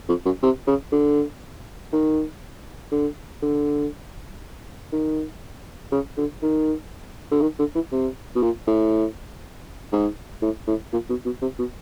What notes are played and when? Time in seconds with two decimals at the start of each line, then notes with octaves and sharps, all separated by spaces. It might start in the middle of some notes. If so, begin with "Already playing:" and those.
0.09 F2
0.25 F#2
0.43 C3
0.67 C#3
0.92 D3
1.93 D#3
2.92 D3
3.42 D3
4.92 D#3
5.92 C#3
6.18 D3
6.43 D#3
7.31 D3
7.42 D#3
7.59 D3
7.75 E3
7.92 C3
8.35 B2
8.43 A#2
8.67 A2
9.92 G#2
10.42 A2
10.67 A2
10.93 A#2
11.10 B2
11.25 B2
11.42 C3
11.59 B2